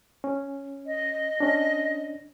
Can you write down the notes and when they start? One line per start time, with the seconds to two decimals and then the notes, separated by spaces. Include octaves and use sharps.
0.24 C#4
0.86 D#5
1.40 C#4 D4